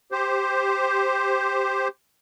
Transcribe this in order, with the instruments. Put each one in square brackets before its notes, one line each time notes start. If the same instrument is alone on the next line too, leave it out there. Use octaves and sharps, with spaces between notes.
[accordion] G4 C5